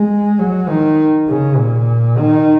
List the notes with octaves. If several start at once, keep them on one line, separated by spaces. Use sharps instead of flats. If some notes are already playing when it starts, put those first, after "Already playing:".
Already playing: G#3
F#3
D#3
C#3
A#2
D#3